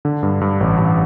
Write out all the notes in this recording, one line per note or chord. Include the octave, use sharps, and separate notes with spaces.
D3
G2
G2
A1
A1